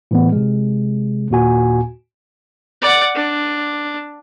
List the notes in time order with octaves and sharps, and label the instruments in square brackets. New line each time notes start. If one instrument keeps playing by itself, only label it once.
[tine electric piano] A2 E3 B3
C3 G#3
D#2 A#2 F#4 G#5
[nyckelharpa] D5 F#5
D4